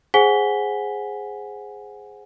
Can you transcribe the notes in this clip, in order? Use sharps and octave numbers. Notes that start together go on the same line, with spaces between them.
G#4 C5 F#5 G#5 B6 G7